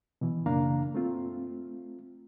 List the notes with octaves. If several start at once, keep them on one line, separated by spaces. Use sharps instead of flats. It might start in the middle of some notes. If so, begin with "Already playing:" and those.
B2 E3
F#2 C#3 A#3 D4 F5 A#5
A3 C4 F4